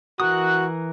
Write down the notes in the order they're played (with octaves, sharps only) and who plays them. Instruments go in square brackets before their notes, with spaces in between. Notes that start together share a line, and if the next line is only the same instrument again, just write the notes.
[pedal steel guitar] E3 A#4 D#6 [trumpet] F#4 [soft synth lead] F#6